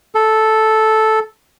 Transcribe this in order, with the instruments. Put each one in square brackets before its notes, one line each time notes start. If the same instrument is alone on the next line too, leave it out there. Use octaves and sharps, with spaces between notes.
[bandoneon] A4